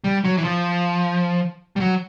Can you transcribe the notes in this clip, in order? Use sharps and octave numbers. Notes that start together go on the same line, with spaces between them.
G3
F#3
E3
F3
G3
F#3